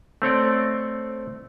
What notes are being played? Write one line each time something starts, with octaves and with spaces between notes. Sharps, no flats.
A3 C4 C#5 D5